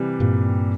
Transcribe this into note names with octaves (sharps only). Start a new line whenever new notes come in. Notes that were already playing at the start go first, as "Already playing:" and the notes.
Already playing: C3 E3 G3
G2 A#2